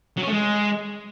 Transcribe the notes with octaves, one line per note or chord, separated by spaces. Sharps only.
F#3
C#4
A3
G#3